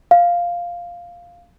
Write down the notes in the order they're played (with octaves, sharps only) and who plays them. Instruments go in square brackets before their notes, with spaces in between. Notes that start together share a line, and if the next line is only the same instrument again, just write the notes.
[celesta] F5